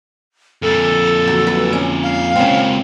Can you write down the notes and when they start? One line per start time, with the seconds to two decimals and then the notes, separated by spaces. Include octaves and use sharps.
0.62 F2 A#2 A4
1.28 F#3
1.47 F#3 B4
1.73 C#4
2.03 F5
2.36 C#2 A#2 C4 C#4